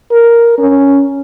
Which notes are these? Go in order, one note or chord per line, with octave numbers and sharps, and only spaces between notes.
A#4
C#4